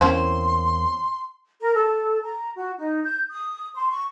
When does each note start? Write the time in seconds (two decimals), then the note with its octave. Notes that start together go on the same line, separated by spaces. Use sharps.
0.01 E2 A#3 C4 C#4 E4 C6
1.60 A#4
1.74 A4
2.23 A#5
2.56 F#4
2.77 D#4
3.03 G6
3.30 D#6
3.74 C6
3.90 C#6